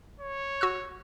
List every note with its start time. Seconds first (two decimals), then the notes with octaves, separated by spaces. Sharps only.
0.20 C#5
0.61 F#4 E6 F#6